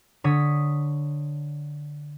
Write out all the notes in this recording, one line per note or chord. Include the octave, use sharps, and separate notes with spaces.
D3 C#5 D#6 B6